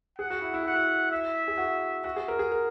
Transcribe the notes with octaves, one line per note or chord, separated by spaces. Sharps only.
G#4 F#5
F#4
E4
E4
F#4 F#5
E4
E5
G#4
F#4
F#4
G#4
A#4
G#4
A#4